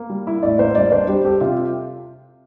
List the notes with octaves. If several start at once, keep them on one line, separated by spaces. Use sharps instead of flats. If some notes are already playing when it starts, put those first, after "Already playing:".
Already playing: A#3
G3
E4
A2 D5
A#3 C5
G3 D5
D4 C5
G3 G4
G4 A4
C3 F4